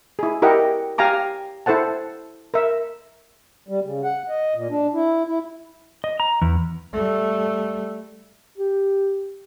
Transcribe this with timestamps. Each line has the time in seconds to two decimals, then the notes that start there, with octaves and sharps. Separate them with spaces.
0.19 E4 G#4
0.42 E4 G4 A#4 D#5 F#5
0.98 G4 F5 G#5 A#5 D6
1.66 E4 A4 C5 F#5 A5
2.54 A#4 E5
3.68 G3
3.84 C#3
4.04 F#5
4.29 D#5
4.55 A#2
4.70 D4
4.94 E4
5.27 E4
6.04 D#5
6.20 A#5
6.42 E2
6.93 G3 A3
8.57 G4